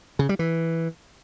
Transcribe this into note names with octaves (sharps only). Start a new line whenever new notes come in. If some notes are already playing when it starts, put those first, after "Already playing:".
C#3
G3
E3